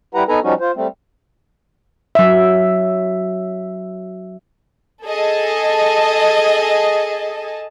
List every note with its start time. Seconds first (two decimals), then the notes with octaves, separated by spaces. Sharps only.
0.15 G3 E4 G4 B4 F#5 A#5
0.29 B3 D#4 A4 B4 G#5 A#5
0.43 F3 G3 C#4 D#4 F#4
0.60 F4 C5
0.76 G3 A3 C4
2.15 F#3 E5
5.06 G#4 A4 D#5 A5